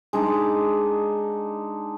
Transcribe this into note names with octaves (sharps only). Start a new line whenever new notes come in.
G#3 D4 D#4